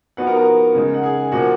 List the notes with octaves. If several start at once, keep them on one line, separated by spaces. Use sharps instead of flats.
F3 B3 D#4 F#4 F#5
A#4 A#5
A#4 A#5
C#3 G#3 D#4
F#5
G#4 G#5
A#2 F3 A#3 F#4 F#5